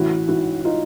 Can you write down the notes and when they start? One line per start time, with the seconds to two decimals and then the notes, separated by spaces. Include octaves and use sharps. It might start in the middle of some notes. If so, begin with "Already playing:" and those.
Already playing: A1 E4 F#4
0.28 G#2 E3 E4 F#4
0.65 D#4 F4